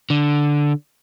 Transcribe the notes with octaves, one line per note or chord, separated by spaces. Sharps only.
D3